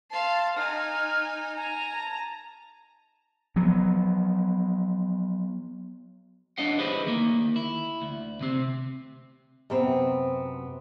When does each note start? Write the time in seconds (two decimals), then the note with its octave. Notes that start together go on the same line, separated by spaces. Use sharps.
0.11 F5 A5 C6
0.56 D#4 G#5 F6
1.56 G#5 A#5
1.98 A5
3.56 F3 F#3 B3
6.58 D4 B4 C#5 D#5 F5 F#5
6.79 E4 G4 G#4 B4 C5 D#5
7.05 D2 D#3 A#3
7.56 E4
8.02 D2
8.41 C3 C4
9.70 F#2 C3 B3 C4